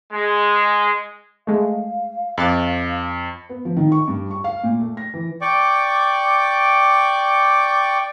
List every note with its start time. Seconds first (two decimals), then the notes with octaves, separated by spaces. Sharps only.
0.12 G#3
1.47 G#3 A3 F5
2.38 F2 D6 F#6 A6
3.49 B3
3.65 F3
3.77 D#3
3.92 C#6
4.08 G2
4.31 C#6
4.44 F5
4.64 A#2
4.80 A3
4.97 A#6
5.14 E3
5.41 D5 G5 C#6 D6